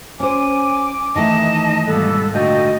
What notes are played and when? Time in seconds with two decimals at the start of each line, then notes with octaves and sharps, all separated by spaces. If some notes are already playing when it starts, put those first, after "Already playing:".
0.20 C#4 C5 G#5 D6
1.16 D#3 E3 A3 D#4 D#5 A5
1.87 G#2 B2 G3 A#3 B3 A4
2.33 A#2 D3 A3 F#4 D#5 G5